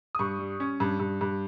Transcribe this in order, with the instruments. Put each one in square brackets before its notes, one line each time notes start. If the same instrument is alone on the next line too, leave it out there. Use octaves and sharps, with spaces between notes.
[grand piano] D#6
G2 C#6
G3
C#4
G2
G2
G2